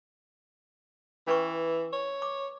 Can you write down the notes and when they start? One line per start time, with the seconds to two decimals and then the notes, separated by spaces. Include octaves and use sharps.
1.27 E3 C#4 B4 C#6
1.93 C#5
2.22 D6